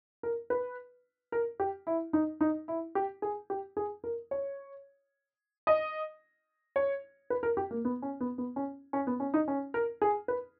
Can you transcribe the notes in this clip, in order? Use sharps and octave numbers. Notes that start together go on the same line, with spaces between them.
A#4
B4
A#4
G4
E4
D#4
D#4
E4
G4
G#4
G4
G#4
A#4
C#5
D#5
C#5
B4
A#4
G4
A#3
B3
C#4
B3
B3
C#4
C#4
B3
C#4
D#4
C#4
A#4
G#4
B4